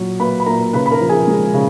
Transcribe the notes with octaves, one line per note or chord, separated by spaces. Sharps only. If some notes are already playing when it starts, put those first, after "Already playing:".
Already playing: A#2 F#3
A#3 B4 B5
B5
A#2 A#4 A#5
C#3 B4 B5
B5
A#4 A#5
F3
G#4 G#5
G#3
C#3